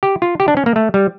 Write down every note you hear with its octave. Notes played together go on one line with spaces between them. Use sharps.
G4
F4
G4
D4
C#4
A#3
A3
G3